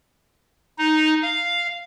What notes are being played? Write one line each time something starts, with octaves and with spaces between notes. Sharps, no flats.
D#4
F5